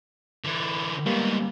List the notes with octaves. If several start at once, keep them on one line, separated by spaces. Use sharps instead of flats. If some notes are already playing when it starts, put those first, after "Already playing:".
D3 E3
G#2 G3 A#3 B3